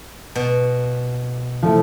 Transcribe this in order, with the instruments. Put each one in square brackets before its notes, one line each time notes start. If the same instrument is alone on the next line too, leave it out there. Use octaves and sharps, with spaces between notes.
[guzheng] B2
[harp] F3 A3 E4